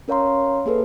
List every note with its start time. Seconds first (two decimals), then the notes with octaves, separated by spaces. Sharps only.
0.08 C#4 A#4 C#5 F5 A#5 C6
0.66 A#3 G#4 A4 B4